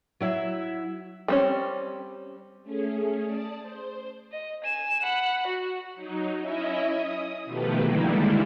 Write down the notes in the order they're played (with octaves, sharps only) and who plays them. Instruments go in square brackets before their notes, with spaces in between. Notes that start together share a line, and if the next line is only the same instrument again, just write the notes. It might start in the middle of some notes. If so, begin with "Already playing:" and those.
[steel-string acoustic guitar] F#3 E4 E5
[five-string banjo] G3 C4 C#4
[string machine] A3 C#4 G#4
D5 A5 D#6
C5
[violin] D#5
G#5 E7
F#5 B5
F#4
[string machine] F#3 D#4
C#4 E4 D#5 E5
D#6
B2 D#3 F3 A3 G4 B4
D3 D#3 G3 G#3 A#3 E4